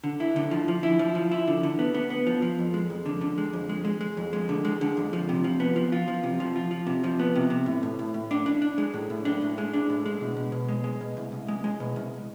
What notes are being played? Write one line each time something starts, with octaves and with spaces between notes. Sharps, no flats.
D3
E4
D3
F3
F3
E4
F3
F3
E4
D3
D3
B3
B3
B3
F3
F3
F2
G#3
F2
D3
D3
G#3
F2
G#3
G#3
G#3
F2
G#3
D3
G#3
D3
F2
F3
C3
F3
B3
F3
F4
F3
C3
F3
F4
F3
C3
F3
B3
C3
C3
A2
A2
A2
A2
D4
D4
D4
G#3
A2
A2
D4
A2
G#3
D4
A2
G#3
B2
B2
B2
G#3
G#3
B2
C2
C2
G#3
G#3
B2
C2